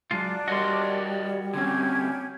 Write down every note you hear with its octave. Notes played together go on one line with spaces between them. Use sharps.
F#3 G#3 D4 F4
G3 F#4 A#4 D5 D#5 C6
D3 C4 C#4 G4 G#6